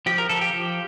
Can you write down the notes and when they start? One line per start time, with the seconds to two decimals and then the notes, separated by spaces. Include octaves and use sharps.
0.06 F3 G4
0.18 A#4
0.29 F3 A4
0.41 G4
0.53 F3